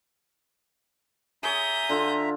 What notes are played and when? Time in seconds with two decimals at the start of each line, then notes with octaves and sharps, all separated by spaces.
1.43 G#4 C#5 E5 A#5 D#6 G6
1.89 D3 F4